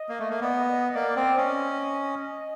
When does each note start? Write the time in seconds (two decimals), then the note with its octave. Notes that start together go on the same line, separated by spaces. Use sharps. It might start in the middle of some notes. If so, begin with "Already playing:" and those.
Already playing: D#5
0.09 A#3
0.19 A3
0.30 A#3
0.41 B3 D5
0.52 D#5
0.90 D#5
0.95 A#3 D5
1.16 C4
1.37 C#4 D#5